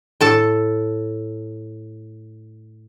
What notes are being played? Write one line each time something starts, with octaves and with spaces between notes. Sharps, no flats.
A2 A4 A5